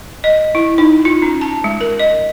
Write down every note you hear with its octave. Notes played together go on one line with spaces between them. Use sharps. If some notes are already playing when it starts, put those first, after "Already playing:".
D#5
E4
D#4
F4
C#4
A5
G#3
A#4
D#5